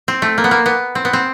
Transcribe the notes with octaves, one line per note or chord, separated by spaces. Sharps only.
C4
A3
A#3
B3
A#3
B3
C4
B3
C4